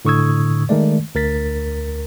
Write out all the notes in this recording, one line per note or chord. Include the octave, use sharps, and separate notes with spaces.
A2 D3 C#6 D#6 E6 G#6
D#3 G#3 A3 D5
D2 A#4 A6 B6